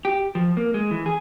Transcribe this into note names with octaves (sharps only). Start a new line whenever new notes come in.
G4
F3
A#3
G#3
E3
G#4